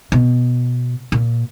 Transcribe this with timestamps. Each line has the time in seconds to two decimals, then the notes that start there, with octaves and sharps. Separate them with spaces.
0.12 B2
1.12 A#2